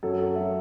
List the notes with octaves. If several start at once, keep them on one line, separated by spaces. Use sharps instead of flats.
F#2 F#3 A4
A4
F#3 E5